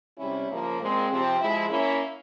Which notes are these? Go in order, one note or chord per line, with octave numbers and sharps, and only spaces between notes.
C3 G3 C#4 E4
C#3 F3 A#3
A#2 G#3 C4
C3 F3 C4 G4
F3 G#3 E4
A#3 C#4 E4